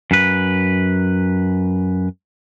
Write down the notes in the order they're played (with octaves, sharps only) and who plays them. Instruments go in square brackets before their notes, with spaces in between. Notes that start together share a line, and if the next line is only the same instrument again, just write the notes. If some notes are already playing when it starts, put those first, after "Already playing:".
[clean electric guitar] F#2 B4